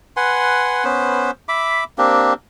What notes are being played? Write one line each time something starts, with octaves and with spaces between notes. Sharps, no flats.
B4 F#5 G#5 C6
B3 C#4 B4 C5
E5 B5 D6
A#3 C4 D4 G4